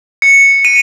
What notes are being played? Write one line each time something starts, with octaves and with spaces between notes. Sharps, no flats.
C#7
D#7